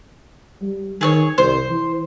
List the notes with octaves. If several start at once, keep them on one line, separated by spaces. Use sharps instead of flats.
G3
D#3 G#4 A4 C#5
C2 C5
E3